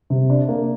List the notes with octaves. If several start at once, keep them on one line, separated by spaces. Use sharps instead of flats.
C3
D4
A#3